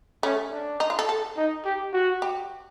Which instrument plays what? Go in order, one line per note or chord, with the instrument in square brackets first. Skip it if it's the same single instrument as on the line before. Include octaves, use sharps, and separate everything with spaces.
[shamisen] A3 [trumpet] C#4
[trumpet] D4
[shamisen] D#4
F4
A4
A4
[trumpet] D#4
G4
F#4
[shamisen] G4